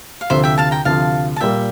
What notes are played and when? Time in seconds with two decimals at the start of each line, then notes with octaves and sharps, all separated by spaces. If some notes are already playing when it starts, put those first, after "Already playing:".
0.21 F5
0.30 D2 C3 F3 C5 E5
0.43 E5 G5
0.58 F5 A5
0.71 G5 A#5
0.85 D2 C3 F3 F5 A5
1.36 A5
1.40 A#2 G3 A#3 E5 G5